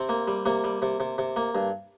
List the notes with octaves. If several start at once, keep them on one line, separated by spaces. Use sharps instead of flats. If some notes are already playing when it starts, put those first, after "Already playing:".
Already playing: C3 C4
A#3
G3
C3 A#3
G3
C3
C3
C3
A#3
G2